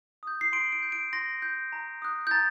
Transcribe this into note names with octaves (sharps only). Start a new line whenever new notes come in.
D#6 G6
C7
C6 D7
D7
G6
D7
C6 A#6
G6
A#5
D#6 F#6
G6
A#5 A6